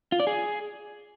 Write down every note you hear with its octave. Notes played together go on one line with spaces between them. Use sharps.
F4
D5
G#4